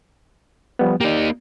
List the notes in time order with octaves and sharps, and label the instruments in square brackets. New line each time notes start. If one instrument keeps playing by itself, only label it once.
[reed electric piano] F3 G3 B3
[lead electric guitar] A#3 D#4 [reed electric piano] G4 D5